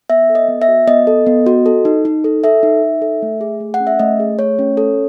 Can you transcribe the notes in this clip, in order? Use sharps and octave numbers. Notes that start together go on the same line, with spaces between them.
B3 E5
A4
D#5
B3
E5
F#4
B3 D#5
A4
B3
F#4
A4
D#4
D#4
A4
A4 E5
D#4
D#4
A4
A3
G#4
A3
F#5
C#4
E5
A3 D#5
G#4
A3 C#5
C#4
A4